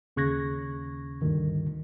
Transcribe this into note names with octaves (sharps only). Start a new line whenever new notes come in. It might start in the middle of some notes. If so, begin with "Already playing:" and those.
D#2 C#3 C#6 F#6 G#6 A#6
D2 G2 D#3